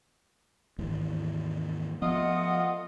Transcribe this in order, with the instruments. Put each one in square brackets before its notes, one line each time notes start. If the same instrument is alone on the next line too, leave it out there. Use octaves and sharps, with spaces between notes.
[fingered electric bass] D#2 G#2 E3
[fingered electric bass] F3 B3 [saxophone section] A3 F4 D#5 [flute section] F#5